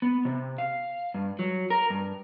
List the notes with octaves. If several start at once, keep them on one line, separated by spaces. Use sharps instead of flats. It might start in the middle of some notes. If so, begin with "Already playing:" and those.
B3
C3
F5
G2
F#3
A#4
G2